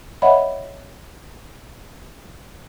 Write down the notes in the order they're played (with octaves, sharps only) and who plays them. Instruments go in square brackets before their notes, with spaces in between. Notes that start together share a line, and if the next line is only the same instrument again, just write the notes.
[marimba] C#5 D#5 E5 F#5 B5